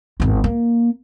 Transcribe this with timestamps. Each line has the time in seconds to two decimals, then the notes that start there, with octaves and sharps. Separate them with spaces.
0.20 G#1 E2
0.44 A#3